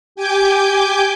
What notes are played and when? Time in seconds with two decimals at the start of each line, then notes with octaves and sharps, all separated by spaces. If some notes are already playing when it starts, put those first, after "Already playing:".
0.16 G4 G#5 D6 G6